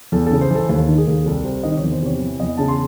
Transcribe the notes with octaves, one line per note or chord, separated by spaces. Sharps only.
E2 A4
A4
C#3
C5
E3 A4
D#2 A4
D#3
G#4
D#2
C2 A4
C3 C5
D#3 D#5
E2 C#5
C5
C3 C#5
E3
E2 D#5
C#3 A5
C6